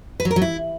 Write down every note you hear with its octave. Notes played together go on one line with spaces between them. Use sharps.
B4
F#3
A#4
F#3
E4